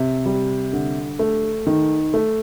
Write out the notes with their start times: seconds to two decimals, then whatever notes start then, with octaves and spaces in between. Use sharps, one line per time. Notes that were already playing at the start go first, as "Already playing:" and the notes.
Already playing: C3
0.26 G3
0.73 D3
1.19 A3
1.67 D#3
2.14 A3